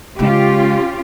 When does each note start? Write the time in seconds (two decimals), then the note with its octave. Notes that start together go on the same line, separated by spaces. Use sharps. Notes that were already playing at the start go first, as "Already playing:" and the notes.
0.19 C#3 G#3 C#4 F4 G4